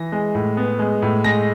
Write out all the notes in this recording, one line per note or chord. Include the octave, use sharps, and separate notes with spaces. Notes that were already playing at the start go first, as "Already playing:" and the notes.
Already playing: E3 A#6
G#3
A2
B3
G#3
A2
G#3 A#6